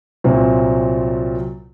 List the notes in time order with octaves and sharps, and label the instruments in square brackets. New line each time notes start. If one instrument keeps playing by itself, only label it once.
[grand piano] C2 A#2 F#3 C4